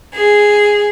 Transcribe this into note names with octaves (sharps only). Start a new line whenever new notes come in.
G#4